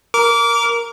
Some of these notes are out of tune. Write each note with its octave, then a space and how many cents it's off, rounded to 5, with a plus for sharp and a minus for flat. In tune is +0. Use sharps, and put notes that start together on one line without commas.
A#4 +0 D6 -25